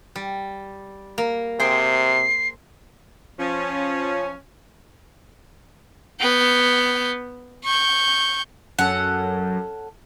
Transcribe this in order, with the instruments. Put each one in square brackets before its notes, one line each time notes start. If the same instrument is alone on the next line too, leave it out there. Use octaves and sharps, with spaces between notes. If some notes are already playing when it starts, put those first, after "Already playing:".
[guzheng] G3
A#3
[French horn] C3 [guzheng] G#4 C5 G5 [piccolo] C7
[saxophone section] F3 C#4
[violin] B3 G6
C#6 G6
[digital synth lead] F#2 [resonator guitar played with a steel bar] C#4 A4 [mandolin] F#5